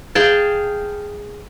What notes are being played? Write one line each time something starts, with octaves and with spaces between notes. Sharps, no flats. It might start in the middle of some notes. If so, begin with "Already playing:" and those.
G#4 F5 G5 A5